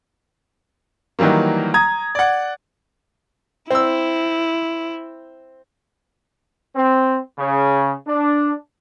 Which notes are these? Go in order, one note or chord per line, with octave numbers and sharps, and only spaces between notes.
D#3 E3 F#3 G3 A#3
A#5 D#6 G#6
D5 F#5
C4 E4 E6
C4
C#3
D4